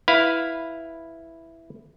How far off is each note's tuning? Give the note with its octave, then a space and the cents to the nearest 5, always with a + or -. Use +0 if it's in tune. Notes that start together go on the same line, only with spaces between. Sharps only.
E4 +0 B4 +0 F5 +0